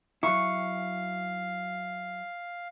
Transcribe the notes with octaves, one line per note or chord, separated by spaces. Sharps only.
F#3 E4 F5 C#6